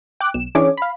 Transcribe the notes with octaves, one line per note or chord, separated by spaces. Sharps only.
G5 D6 F#6
B1 E7
E3 C#4 D4 G#4 C#5 D6
F5 B5